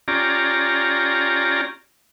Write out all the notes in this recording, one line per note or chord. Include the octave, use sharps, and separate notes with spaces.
C#4 F4 G4 D5 A#5